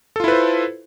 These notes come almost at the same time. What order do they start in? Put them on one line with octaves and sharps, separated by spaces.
A4 F4 E4 B4 C5